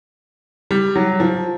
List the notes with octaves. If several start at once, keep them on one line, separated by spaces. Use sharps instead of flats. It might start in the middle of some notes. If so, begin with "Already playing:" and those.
G3
F#3
F3